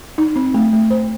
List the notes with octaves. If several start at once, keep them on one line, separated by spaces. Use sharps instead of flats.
D#4
C4
A3
A3
C5